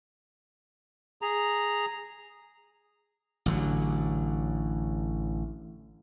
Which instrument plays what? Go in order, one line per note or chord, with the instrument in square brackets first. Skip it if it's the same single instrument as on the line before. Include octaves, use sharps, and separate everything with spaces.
[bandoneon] G#4 A#5
[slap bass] A1 D3 F#3